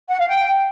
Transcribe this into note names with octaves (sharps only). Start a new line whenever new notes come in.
F#5
F5
G5